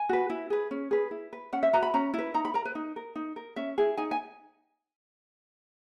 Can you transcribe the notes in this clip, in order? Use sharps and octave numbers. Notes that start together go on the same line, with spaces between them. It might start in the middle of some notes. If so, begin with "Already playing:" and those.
Already playing: G#5
F#4 B4
E4
G#4 B4
C#4
G#4 B4
E4
B4
C#4 F#5
E5
F#4 B4 A#5
B5
C#4 A#5
E4 B4
D#4 A#5
B5
A#4 A#5
B4
D#4
A#4
D#4
A#4
C#4 E5
E4 G#4
D#4 G#5
G#5